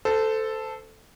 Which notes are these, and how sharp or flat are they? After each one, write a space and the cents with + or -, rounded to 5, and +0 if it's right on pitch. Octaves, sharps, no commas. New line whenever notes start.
A4 +0 C5 -25